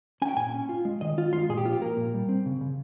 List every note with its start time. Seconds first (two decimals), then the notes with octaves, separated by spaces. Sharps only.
0.22 C#4 G#5
0.28 G5
0.37 A#2 G#5
0.54 C#4
0.69 F4
0.85 G#3
1.01 D#3 D#5
1.17 D#3 F4
1.33 G#3 F4
1.49 A#2 G#4
1.57 G4
1.65 F3 F4
1.73 G4
1.82 A#3 A#4
1.97 A#2
2.14 G3
2.29 C4
2.46 C#3
2.61 C#3